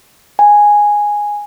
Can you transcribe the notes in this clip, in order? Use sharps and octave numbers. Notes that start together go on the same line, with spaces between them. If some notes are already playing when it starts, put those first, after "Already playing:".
G#5